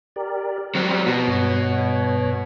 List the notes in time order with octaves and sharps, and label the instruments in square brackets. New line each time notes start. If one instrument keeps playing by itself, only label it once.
[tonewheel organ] G4 A#4 D5
[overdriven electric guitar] F#3 G3 [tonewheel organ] C4 C6
[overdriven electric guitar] B2 [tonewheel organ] F#4
[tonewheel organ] G2 C#5